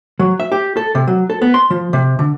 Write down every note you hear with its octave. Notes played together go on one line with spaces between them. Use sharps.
F#3
E5
G4
A4
C3
F#3
A4
B3
C6
F3
C3
D3